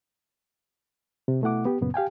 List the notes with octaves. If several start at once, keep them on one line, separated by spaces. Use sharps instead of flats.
C3
B2 A3 E4 F#5 D6
B3 G4
F#2 A#2 C#3 B3
G4 F5 G5 G#5